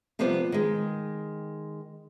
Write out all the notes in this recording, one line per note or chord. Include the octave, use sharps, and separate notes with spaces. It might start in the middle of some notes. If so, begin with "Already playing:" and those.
C3 F3 G3 B3 C5 D5
D#3 G#3